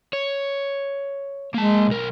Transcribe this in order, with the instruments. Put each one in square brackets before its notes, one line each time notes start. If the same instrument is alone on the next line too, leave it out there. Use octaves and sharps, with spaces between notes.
[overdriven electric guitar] C#5
[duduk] G#3 [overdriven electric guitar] A#3 A5
[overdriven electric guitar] B1 A#4